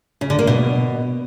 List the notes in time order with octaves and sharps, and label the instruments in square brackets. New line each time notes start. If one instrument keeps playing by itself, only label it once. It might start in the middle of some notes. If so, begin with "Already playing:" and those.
[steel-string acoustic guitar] C#3
D3
A#3
B2